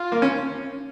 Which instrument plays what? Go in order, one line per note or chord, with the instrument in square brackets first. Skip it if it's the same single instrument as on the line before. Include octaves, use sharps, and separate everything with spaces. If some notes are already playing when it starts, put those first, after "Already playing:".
Already playing: [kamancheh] F4
[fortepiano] A#3
C#4